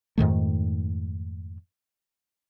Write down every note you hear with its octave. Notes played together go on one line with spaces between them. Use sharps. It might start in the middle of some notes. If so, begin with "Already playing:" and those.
F2 G#2 D#3 A3